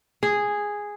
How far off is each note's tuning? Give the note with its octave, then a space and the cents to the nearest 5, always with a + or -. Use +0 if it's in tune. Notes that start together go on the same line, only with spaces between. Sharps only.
G#4 -5